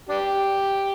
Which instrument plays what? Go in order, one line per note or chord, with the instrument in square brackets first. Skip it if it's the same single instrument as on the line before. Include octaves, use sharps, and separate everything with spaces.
[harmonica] D4 G4